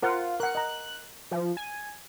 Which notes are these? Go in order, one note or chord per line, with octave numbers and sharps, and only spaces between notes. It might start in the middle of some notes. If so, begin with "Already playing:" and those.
F4 A#4 C5 F#5
A#4 F#5 F#6
D#5 A#5
F3
G#5